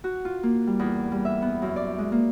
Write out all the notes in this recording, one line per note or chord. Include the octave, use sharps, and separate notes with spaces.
F#4
F4
A#3
G3
E2
G3
E5
B3
F#2
D5
G#3
A#3